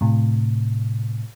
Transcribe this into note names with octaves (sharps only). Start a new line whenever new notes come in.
A2 C3